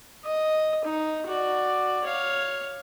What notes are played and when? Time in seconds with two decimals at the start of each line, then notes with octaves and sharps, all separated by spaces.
0.24 D#5
0.85 D#4
1.27 F#4 D5
2.05 C#5 F5